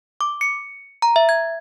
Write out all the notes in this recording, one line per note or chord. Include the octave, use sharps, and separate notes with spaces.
D6
C#7
A#5
E5
G#6